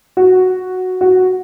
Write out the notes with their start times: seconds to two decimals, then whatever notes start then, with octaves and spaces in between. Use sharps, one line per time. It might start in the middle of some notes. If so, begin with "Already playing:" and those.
0.17 F#4
1.01 F#4